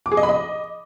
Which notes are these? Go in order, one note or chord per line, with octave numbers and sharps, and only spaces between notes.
D6
G#4
D#5
B5
D#5